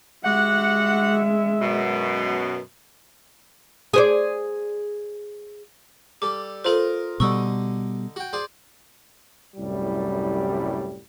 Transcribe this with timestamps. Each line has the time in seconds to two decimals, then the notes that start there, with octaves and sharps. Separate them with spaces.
0.24 G#3 F#4 G4 E5 F#5
1.61 F#2 B2
3.93 G#4 C5 D5
6.22 G3 A4 D6
6.64 F4 A4 A#4 C5 D#5
7.20 B2 D3 G3 D#4 C#6 D#6 E6
8.16 F#4 G5
8.33 G#4 C5 D5
9.56 C2 F#2 A2 G3